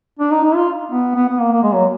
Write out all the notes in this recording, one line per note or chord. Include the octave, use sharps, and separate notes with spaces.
D4
D#4
D#4
F4
B3
B3
B3
A#3
A#3
G#3
F#3